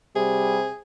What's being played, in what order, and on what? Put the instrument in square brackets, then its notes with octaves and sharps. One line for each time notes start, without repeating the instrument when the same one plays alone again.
[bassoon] C3 [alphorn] G3 [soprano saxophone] G#4